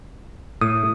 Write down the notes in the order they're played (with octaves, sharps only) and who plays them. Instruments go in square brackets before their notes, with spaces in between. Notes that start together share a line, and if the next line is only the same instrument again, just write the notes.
[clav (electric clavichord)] A2 [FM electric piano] D#6